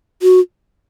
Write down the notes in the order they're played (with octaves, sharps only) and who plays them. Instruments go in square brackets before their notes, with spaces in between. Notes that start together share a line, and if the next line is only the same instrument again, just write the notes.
[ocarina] F#4